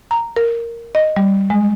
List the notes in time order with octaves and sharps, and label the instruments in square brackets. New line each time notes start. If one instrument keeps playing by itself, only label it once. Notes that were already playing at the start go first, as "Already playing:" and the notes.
[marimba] A#5
A#4
D#5
G3
G#3